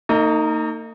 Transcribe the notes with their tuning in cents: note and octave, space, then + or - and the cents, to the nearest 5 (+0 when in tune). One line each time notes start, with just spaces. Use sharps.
A#3 -45 D#4 +0